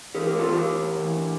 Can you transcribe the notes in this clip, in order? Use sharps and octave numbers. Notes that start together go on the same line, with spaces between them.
E3 G4 A#4
A2 G4 A#4
F4 A4
E3 G4 A#4
E3
A2
E3
D3